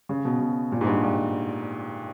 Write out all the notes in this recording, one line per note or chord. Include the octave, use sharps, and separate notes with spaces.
C#3
B2
B2
A#2
G#2
G2
G2